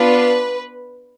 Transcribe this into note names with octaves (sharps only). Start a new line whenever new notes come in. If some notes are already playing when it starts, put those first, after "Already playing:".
Already playing: B3 D4 F4 B4